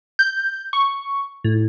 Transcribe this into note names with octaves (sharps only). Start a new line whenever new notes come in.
G6
C#6
A2